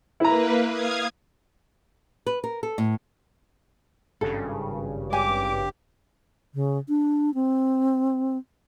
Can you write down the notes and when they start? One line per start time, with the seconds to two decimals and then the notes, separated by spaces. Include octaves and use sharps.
0.20 A#3 E4 B4 A#5
0.69 F5 D#6 G#6
2.26 B4
2.44 A#4
2.63 A4
2.78 A2
4.21 G#1 G2 C#3 A4
5.13 G4 G#5 D6
6.54 C#3
6.89 D4
7.34 C4